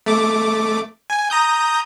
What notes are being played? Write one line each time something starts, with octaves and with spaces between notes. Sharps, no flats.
A3 D6
G#5
A#5 D#6 G6